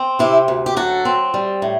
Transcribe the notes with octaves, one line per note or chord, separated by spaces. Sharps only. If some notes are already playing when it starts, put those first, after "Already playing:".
Already playing: C4
C3 E4 G4
D2
G4
F#3 F#4 A4
C4
G3
A2